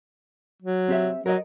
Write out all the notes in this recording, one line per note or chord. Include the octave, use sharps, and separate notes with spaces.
F#3
C4 G4 E5
F#3 A#4 D#5